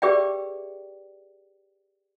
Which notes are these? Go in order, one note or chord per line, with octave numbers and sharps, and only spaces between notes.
G4 G#4 B4 D5 E5 G5